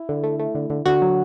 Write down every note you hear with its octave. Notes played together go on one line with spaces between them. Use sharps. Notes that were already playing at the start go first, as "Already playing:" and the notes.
Already playing: E4
D3
A3
A3
D3
D3
D3 F#4
F#3